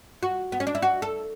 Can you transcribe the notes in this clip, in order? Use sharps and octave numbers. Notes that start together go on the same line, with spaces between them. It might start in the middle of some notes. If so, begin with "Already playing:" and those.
F#4
B3
C#4
D4
E4
F#4
A4